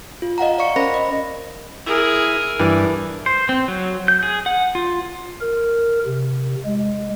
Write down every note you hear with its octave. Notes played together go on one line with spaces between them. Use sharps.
F4
D#5 F5 F#5 A#5
D5 F5 C#6 C#7
C#4 A#4 C5 B5 A#6
D#5
E4 G#4 A#4
G2 E3 D4
C5
C4
F#3
G6
G#4
F#5
F4
A#4
C3
G#3